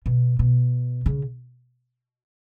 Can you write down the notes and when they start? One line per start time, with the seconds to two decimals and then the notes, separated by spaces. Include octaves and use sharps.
0.06 B2
0.39 B2
1.06 C#3